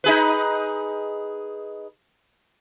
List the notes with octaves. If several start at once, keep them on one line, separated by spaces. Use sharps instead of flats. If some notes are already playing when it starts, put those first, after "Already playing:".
D#4 G#4 B4